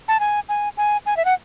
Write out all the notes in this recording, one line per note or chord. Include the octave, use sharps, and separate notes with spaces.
A5
G#5
G#5
G#5
G#5
E5
F#5